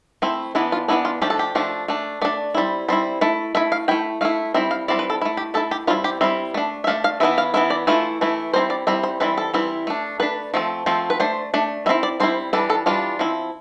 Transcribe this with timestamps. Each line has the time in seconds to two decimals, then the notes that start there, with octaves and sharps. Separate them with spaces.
0.22 A3 C4 E4
0.55 E3 B3 D4 E4
0.72 F4
0.88 E3 B3 D4 E4
1.05 F4
1.21 F3 A3 D4 G4
1.30 A4
1.39 G4
1.55 F3 A3 D4
1.88 A3 D4
2.22 A3 D4 D5
2.54 G3 C4 E4
2.89 G3 C4 E4
3.21 A3 E4
3.55 A3 E4 E5
3.72 F5
3.88 A3 E4 G5
4.21 A3 E4 F5
4.54 G3 C4 E4 E5
4.71 F5
4.88 G3 C4 E4 D5
4.99 B4
5.10 A4
5.21 A3 E4
5.37 G4
5.54 A3 E4 A4
5.71 G4
5.87 G3 C4 E4 F4
6.04 G4
6.21 G3 C4 E4 E5
6.54 A3 D4
6.84 E5
6.87 A3 D4 F5
7.04 F5
7.20 E3 B3 E4 E5
7.38 F5
7.54 E3 B3 E4 E5
7.70 D5
7.87 E3 A3 E4 F4
8.21 E3 A3 E4
8.53 G3 C4 E4 C5
8.70 D5
8.87 G3 C4 E4 E5
9.03 C5
9.20 E3 G3 C4 E4 B4
9.37 A4
9.54 E3 G3 C4 E4
9.87 A3 D4
10.20 A3 D4 B4
10.54 F3 A3 C4
10.86 F3 A3 C4
11.10 B4
11.20 A3 D4 C5
11.54 A3 D4
11.86 G3 E5
11.89 C4 E4
12.03 D5
12.20 G3 C4 E4 C5
12.53 E3 G3 D4 A4
12.70 A4
12.86 E3 G3 D4 F4
13.19 F3 C4 E4